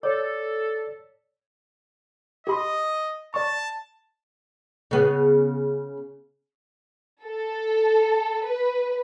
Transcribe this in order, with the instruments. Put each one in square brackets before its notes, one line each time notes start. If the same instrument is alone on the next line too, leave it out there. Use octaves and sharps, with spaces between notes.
[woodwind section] A4 [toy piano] C#5 [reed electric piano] D5
[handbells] G4 B5 C6 [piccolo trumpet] D#5
[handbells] D5 C#6 [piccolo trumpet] A5
[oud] C#3 B3
[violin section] A4
B4